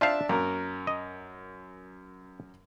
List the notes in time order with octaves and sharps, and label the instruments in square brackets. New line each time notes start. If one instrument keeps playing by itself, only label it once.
[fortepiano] D4 E5 A5 [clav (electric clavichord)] F4 C5 F5
[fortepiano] F#2 A#4 [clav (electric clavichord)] A#3
[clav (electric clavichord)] D#5